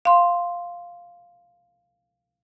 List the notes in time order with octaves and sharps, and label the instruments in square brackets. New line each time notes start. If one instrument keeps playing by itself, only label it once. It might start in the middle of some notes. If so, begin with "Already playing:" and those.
[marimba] F5 C6